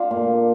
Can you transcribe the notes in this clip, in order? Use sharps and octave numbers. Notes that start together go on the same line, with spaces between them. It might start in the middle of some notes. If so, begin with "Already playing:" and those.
Already playing: D4 F4
A#2